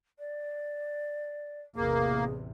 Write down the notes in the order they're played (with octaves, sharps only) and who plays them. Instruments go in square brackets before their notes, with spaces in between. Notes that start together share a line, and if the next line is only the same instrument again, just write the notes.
[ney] D5
[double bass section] A1 E2 C3 [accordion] A#3 [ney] G#4